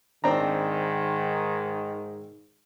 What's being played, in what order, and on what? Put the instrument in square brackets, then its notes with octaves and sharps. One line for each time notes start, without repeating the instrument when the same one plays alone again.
[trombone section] G#2 D#3 [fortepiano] C4 D4 A#5